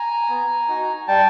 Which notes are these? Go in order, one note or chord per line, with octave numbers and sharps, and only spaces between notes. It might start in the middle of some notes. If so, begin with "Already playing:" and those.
Already playing: G#5 A#5
B3
D#4 F#4
G3 G5 A5